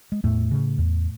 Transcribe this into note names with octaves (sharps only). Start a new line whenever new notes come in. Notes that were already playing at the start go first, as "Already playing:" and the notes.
G#3
E2 A2 A3
C#3
E2